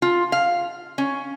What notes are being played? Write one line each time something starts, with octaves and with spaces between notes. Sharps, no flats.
F4
F5
C#4